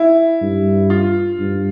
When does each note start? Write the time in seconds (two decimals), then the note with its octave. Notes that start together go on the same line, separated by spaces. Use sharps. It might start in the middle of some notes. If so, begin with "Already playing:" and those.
Already playing: E4
0.41 G2
0.90 F4
1.39 G2